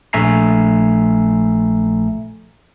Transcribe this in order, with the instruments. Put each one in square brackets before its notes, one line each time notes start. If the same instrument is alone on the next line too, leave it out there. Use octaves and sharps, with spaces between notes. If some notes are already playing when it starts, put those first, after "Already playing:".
[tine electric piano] A#1 A3 E5 G#5 A#5 C7